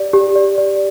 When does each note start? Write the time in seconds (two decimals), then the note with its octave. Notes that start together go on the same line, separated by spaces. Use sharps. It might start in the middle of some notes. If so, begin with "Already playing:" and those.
Already playing: G4 D5
0.13 G4
0.36 D5
0.58 D5